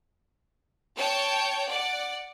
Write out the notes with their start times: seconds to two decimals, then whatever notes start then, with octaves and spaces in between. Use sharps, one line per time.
0.97 C#5 G5 A5 G6
1.69 D5 F#5